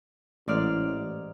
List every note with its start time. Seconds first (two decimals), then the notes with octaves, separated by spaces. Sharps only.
0.48 A1 G#2 D5 F6